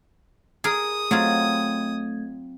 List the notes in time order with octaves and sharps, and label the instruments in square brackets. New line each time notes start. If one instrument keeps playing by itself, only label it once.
[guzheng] G#4 A#4 [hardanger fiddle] D#6
[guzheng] F#3 C4 F4 [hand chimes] A3 G#6